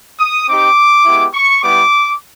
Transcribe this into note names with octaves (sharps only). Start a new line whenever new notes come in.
D#6
C4 D#4 G4 D6
G#3 B3 E4 G4
C#6
G3 B3 E4 G4 D6